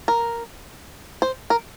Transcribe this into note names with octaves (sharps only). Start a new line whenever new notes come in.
A#4
C5
A#4